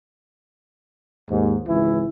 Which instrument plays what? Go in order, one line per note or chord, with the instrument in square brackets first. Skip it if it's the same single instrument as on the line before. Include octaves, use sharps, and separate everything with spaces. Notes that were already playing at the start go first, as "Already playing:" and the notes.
[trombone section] D#2 G#2
G#1 C#2 E3 E4